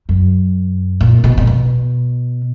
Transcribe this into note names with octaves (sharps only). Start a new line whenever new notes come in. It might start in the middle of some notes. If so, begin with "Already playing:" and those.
F#2
A#2
B2
A#2
B2